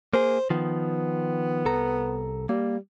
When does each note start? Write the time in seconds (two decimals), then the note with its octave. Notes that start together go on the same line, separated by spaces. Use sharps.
0.14 A#3 G#4 C5
0.50 D#3 F3 B3
1.65 C2 A4 A#5
2.49 G3 A#3